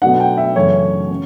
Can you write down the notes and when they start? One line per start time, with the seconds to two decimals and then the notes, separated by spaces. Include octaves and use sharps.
0.02 B2 F#3 A3 D4 F#5
0.20 G5
0.38 E5
0.56 F#2 C#3 E3 A3 C#4 C#5
1.10 C#4